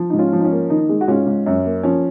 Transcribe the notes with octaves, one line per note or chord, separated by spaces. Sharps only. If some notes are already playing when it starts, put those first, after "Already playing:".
Already playing: F3
G#2 D#4
C#4 F4
F3
D#4
C#4
A#3
D#3 D#4
G#3
F#4
G#2 C#4 F4
G#2
F#2 C#4
A#3
F3 C#4